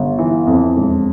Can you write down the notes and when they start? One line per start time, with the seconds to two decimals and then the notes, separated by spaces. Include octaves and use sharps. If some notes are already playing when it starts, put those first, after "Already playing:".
Already playing: G1
0.18 E3
0.47 F2
0.76 E1